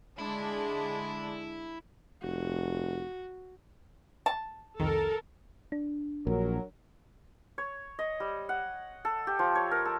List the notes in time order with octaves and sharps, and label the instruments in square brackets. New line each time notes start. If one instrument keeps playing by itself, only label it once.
[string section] D3 G#3 D4 [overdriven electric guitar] E4
[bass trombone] F1 [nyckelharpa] F#4
[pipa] A5
[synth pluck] C2 F2 D#3 [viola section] A4 A#4
[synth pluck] D4
[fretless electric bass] A#1 [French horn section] F#3 A#4
[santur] C#5
D#5
G3
F#5
A4
G4
F3
C#5
A#4
A4